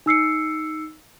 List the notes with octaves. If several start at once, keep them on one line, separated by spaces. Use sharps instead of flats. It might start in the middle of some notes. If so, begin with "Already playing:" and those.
D#4 E6 C7 C#7